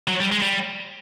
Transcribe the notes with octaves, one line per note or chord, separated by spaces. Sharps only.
F#3
G3
G#3
G3